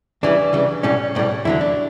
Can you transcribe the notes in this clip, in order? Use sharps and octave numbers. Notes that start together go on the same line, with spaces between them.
C#2 C#3 E3 G3 D4
C#2 C#3 E3 G3
B1 A2 G3 C#4
B1 A2 G3
E2 D3 F#3 E4
D4